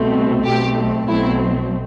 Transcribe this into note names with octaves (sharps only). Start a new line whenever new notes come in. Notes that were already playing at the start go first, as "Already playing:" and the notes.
Already playing: C2 B2 A3 C4
B1 B2 A3 C4 G4
B1 B2 F#3 A3 C4 E4